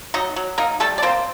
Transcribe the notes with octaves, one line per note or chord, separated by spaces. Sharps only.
F#3 D#4 D#5
F#3
A#3 D#4 A#4
G3 A3 A4
D5
A#3 C4 C5